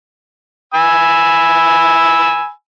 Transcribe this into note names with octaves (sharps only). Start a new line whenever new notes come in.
G#5 B5 E6